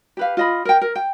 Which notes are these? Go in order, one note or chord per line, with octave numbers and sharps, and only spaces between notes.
G4 B4 F5
F4 D#5 B5
A#4 G5
A#4
G5